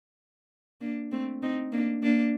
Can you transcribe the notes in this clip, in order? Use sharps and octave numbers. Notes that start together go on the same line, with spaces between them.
A#3 D4
A3 C4
C4 D#4
A#3 D4
A#3 D4